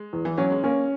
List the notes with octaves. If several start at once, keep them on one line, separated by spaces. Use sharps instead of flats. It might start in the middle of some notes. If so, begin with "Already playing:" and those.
Already playing: G#3
E2
E3
F#3 C#4
G#3
A#3 C#4